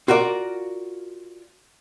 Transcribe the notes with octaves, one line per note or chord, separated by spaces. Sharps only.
F4 F#4 A#4 D5